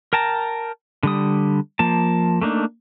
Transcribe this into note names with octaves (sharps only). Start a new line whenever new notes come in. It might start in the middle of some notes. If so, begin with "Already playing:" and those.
A#4 G5 A5 A#5
D3 G3 D#6
F3 A#3 A5
A3 A#3 D4 D#4